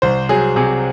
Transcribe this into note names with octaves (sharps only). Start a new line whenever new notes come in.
C2 C5
F#3 G#4
C3 G#4